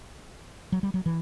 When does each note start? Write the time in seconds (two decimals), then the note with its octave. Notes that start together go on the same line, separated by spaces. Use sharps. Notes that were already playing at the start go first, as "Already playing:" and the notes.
0.72 F#3
0.83 G3
0.94 F#3
1.06 E3